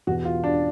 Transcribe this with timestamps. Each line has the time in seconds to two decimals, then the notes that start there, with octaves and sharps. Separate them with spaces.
0.07 E2 B2 F#4
0.25 F4
0.44 D4